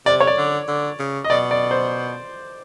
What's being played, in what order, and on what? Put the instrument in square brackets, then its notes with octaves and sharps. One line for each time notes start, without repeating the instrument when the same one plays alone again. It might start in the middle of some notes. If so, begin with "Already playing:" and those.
[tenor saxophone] C3 [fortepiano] D5
[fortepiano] C#5
D5
[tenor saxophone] D3
D3
C#3
[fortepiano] D#5
[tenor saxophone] B2 [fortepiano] D5
[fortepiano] D5
C5